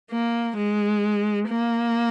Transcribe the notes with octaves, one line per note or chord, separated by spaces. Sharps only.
A#3
G#3
A#3